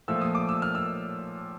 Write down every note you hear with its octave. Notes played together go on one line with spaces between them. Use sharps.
A#2 F3 A3 E6
D#6
D6
E6
F6
E6